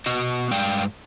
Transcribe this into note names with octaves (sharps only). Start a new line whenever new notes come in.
B2 B3 F#4 D#5
G2 G#3 D5 F5 G5